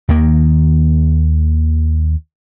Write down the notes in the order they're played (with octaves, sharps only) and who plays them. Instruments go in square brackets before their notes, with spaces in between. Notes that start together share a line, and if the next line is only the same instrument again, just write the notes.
[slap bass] D#2 D#3 A#3